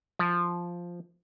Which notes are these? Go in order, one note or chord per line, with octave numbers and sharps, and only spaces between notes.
F3